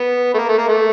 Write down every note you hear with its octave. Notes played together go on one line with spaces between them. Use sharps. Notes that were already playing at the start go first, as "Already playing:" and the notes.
Already playing: B3
A3
A#3
A3
A#3
A3